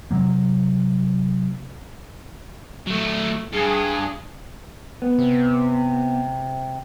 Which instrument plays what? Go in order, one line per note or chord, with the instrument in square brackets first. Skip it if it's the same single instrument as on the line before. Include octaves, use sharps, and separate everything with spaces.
[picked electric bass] C3 F#3 A#3
[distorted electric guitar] F#3 A3
[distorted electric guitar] G2 [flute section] G#4
[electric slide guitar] B3
[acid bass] C3